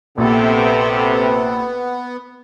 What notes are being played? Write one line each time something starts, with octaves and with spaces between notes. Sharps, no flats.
A#1 C3 A3 B3 C4 A4